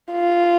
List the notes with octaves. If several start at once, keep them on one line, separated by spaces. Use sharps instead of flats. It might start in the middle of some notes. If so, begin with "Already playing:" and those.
F4